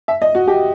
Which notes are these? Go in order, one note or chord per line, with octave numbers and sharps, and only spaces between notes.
E5
D#5
F#4
G4